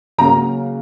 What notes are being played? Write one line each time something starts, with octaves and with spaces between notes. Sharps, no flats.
C#3 F#3 A#3 C#4 A#5